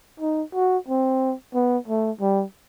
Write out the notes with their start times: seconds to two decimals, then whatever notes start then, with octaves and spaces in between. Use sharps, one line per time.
0.20 D#4
0.54 F#4
0.88 C4
1.54 B3
1.88 A3
2.21 G3